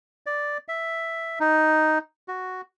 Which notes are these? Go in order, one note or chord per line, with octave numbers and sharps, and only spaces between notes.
D5
E5
D#4
F#4